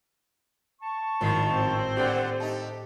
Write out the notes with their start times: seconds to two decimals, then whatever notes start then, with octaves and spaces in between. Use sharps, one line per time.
0.81 A5 C#6
1.21 G#1 F#2 A2 D#3 F3 C7
1.52 C4 C5
1.97 A#2 D3 A3 G4 D5 F#5 G5
2.40 A3 D#4 G4 A5